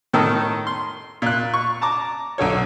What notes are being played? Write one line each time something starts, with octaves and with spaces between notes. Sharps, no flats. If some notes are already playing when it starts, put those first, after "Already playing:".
A2 D#3 A4 A#5 D#6 F6
C6
A#2 F#6
C#6
A5 A#5 D6
B1 D3 A4 C#5